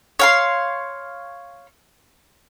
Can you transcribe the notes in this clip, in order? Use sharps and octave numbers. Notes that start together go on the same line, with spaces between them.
C#5 F5 C6